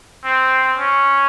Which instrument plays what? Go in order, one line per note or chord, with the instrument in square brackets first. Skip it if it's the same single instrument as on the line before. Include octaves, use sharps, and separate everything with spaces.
[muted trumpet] C4
C#4